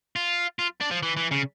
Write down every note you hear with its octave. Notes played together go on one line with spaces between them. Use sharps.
F4
F4
D4
F3
E3
E3
C#3